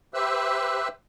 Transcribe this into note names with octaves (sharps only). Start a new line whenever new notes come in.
G4 B4 C5 E5 E6 F#6